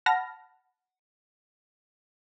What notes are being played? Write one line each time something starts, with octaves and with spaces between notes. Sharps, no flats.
F#5 A5 B5 F6 A#6